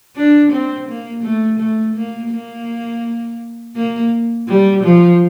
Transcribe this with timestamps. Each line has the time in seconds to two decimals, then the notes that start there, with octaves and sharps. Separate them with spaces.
0.16 D4
0.51 C4
0.88 A#3
1.23 A3
1.59 A3
1.95 A#3
2.31 A#3
3.76 A#3
4.47 G3
4.83 F3